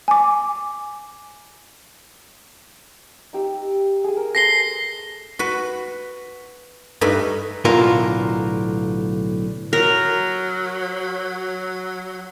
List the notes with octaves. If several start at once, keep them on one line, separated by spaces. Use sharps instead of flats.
G#5 D6
D#4 G4 E6
G#4 E6
A#4
G#4 A4 C5 A#6 C7 G7
F#4 B4
G2 A3 D#4 B4
B1 A2 D3 F4 A#4
F#3 A#4